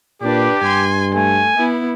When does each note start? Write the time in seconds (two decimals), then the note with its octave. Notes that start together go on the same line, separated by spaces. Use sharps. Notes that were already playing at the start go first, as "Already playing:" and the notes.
0.22 A#2 D4 G4 B4
0.62 G2 G#5 C6
1.14 A3 G#5
1.57 B3 E4